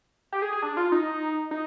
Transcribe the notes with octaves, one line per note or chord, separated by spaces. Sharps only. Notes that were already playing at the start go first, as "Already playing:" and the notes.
G4
G#4
G#4
D4
F4
D#4
D#4